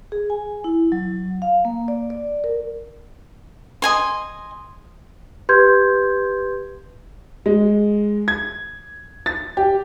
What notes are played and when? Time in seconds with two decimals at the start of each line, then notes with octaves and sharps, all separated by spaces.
0.12 G#4
0.30 G#5
0.64 E4
0.92 F#3
1.42 F5
1.65 A#3
1.88 D5
2.10 D5
2.44 A#4
3.82 D#5 G#5 C6
5.49 G4 B4 C6 G6 G#6
7.46 G#3
8.28 G#6
9.26 A6
9.57 G4